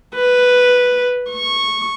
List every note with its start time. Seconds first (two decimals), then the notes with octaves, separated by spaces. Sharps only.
0.14 B4
1.30 C#6